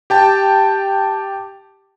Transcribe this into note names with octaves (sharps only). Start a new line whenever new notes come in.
G4 G5 A5